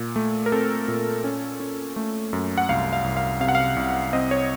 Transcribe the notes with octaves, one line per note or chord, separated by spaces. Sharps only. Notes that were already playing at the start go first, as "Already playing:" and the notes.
Already playing: A#2
A3
A#4
C4 A4
A#2
C#4
C#4
A3
F#2
F#5
C2 F5
F5
C2
F5
C3 F5
F#5
F5
C2
C4 D#5
C#5